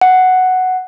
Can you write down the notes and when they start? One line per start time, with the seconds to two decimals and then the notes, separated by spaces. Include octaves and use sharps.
0.01 F#5